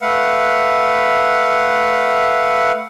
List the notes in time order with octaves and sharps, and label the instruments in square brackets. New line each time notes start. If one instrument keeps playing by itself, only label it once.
[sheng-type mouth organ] A3 B4 F5 F#5